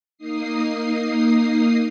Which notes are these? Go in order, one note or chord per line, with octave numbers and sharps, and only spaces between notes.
A#3 D#4 D#6 C7